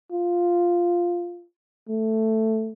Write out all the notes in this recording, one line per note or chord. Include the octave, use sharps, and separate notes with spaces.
F4
A3